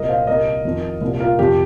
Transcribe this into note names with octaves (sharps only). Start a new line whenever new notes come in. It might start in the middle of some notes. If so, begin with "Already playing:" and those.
Already playing: C2 A#2 A#4 D#5
C5 F5
C2 A#2 A#4 D#5
F2 D#3
C2 A#2
F4 A#4
F2 C3 D#3 G4